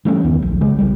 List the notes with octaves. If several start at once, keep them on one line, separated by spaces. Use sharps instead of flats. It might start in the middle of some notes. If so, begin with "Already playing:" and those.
E3 G3 A3 C#4
F#1 D#2 D#3 B3
A#1
C#3 G#3
B1 G3